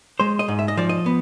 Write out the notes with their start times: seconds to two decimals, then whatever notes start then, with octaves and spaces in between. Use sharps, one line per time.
0.20 G#3 C5
0.39 D#5
0.48 G#2
0.59 E5
0.68 D#5
0.77 F3 D5
0.89 D#5
1.06 B3